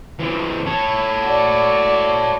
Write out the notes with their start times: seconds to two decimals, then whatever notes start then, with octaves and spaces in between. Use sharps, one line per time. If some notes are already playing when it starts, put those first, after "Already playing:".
0.20 E3 C4
0.66 A4 C#5
1.23 F#4 D5